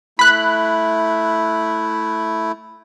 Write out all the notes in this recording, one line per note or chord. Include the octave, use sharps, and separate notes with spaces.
A3 E4 B5 F#6